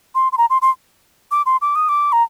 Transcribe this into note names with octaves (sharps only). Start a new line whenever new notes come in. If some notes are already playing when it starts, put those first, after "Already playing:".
C6
C6
A#5
C6
C6
D6
C6
D6
D#6
D6
A#5